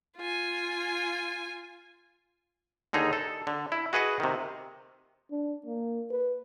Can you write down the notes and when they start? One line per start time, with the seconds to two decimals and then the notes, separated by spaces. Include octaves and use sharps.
0.17 F4 G#5
2.93 D#2 D3 D#4 G#4 A#5
3.13 A4
3.47 D3
3.72 E4
3.93 F#4 G#4 B4 D#5 F#5
4.20 C3 D#3
5.31 D4
5.66 A#3
6.11 B4